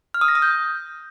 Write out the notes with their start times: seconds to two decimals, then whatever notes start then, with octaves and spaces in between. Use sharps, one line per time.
0.14 F6
0.21 D#6
0.28 A#6
0.35 D#6
0.42 G6